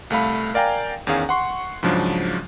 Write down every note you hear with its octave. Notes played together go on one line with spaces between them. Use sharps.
C2 A3 F5 B5
A#4 D5 F5 G5 G#5 A#5
E2 D#3 C#4 G#4 F5
F#5 C6 C#6
G#2 C#3 F3 F#3 D4